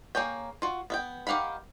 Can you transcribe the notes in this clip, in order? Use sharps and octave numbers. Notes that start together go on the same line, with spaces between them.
A#3 G#4 C#5 G5
F4 F#4
B3 E5 G5
D#3 G4 F5 F#5 B5